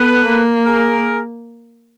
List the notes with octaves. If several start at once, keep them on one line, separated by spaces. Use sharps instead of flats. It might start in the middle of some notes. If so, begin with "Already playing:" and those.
Already playing: B3 A4 B4
A#3
G#4 A#4